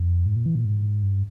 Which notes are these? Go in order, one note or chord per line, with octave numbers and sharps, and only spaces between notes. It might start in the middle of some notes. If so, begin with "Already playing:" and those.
Already playing: F2
G#2
A#2
E3
A#2
G#2
G2